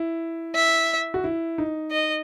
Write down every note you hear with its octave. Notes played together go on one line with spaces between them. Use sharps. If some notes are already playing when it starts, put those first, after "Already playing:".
Already playing: E4
E5
F#4
E4
D#4
D#5